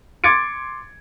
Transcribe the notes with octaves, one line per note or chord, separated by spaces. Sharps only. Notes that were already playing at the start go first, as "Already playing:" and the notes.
C6 D6 G#6 A6 C#7 D7